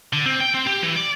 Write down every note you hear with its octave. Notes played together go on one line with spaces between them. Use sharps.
D3
C4
G5
C4
G4
E3
D5